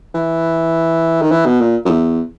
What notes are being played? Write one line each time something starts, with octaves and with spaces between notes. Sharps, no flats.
E3
D#3
E3
B2
A#2
F#2
E2